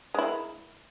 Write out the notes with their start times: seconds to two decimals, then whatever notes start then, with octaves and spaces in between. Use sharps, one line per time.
0.14 G#3
0.19 E4
0.23 A#3